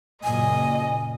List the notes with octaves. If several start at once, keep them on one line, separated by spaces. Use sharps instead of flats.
F#1 A#2 D#5 G#5